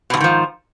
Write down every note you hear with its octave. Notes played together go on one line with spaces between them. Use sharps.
E2 G#2 B2 D#3 F3